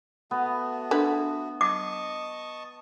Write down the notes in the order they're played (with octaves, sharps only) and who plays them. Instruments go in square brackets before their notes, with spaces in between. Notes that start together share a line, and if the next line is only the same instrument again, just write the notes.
[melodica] A3 F#4 [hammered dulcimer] B3
[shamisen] D3 B4 B5
[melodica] D#5 A5 C#6 [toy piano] D6